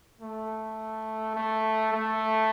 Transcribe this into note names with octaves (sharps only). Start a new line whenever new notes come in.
A3
A3
A3